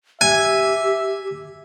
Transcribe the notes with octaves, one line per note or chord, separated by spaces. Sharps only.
G4 E5 G#5